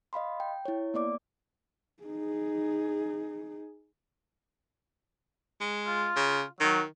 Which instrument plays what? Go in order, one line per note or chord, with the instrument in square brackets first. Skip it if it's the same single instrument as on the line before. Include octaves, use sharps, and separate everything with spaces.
[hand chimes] D#5 F5 B5 C6
G5
E4 C#5
A#3 B3 D5 D6
[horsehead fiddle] D#4 G#4
[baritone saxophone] G#3
[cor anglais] F4
[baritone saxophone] C#3
[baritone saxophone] D#3 [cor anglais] F#3